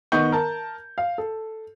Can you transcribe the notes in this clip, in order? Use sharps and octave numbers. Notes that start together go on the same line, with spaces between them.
D#3 B3 D#5 F#5 C#6 G6
A#4 A5
F5
A4